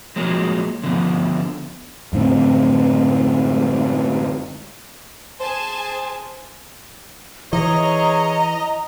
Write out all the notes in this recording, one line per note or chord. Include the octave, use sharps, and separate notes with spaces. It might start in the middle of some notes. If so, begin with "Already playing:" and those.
F3 F#3 G#3 A#3
D3 F3 B3
F#2 A2 D3 C4
G#4 C5 G#5 A5
E3 G#4 C#5 D#5 A#5